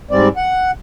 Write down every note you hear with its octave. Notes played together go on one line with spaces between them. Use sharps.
G#2 G3 C4 D5
F#5